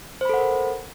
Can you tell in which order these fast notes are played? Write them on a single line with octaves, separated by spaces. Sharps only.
C5 B5 A4 F#5 A#4